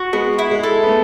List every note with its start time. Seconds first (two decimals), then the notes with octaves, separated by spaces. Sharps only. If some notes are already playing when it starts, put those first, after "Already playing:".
Already playing: F#4
0.13 G#3 B3
0.39 E4
0.51 G#3
0.63 A4
0.83 B3
0.88 A3